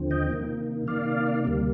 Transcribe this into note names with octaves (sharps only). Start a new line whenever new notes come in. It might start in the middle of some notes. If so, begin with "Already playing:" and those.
Already playing: D#2 D3 F3 C4
D#5 G5
C3 D#3 A#3
C3 D#3 A#3 D5 F5
D2 C3 G3 A#3